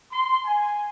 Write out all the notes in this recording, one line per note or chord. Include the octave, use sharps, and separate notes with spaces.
C6
G#5